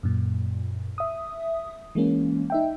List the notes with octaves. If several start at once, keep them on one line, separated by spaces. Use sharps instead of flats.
F#2 A#2
E5 D#6
E3 G#3 A#3 C#4
D#4 E5 G5